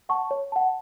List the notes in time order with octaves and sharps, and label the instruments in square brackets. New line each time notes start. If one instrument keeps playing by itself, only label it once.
[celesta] F#5 A5 C#6
C#5
F#5 A5